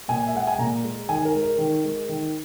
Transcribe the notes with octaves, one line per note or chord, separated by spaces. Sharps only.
A#2 G#5
E5
G#3 F#5
G#5
A#2 A#5
G#3
D#3 G#5
A#4
G#3
A#4
D#3
G#3
D#3